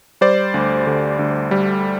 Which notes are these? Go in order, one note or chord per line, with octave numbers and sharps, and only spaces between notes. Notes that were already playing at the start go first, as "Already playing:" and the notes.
G3 C5 D5
D2
D3
D2
G3